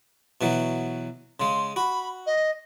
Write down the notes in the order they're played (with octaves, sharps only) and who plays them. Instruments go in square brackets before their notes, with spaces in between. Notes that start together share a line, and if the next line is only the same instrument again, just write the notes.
[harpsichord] B2 E3 F#3
[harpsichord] C#3 G#3 [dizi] C6
[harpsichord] F#4 [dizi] B5
[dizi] D#5